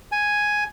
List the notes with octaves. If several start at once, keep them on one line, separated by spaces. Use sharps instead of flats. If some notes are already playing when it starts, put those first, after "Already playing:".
G#5